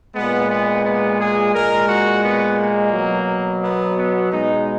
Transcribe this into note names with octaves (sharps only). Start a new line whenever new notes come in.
A#2 G#3 B3
B3
B3
G#4
A#2 G#3 A#4
F#4
B3
A#3
B2 F#3
B3
B3
B2 G#3 D#4